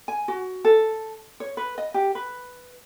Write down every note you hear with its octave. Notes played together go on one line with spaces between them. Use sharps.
G#5
F#4
A4
C#5
B4
D#5
G4
B4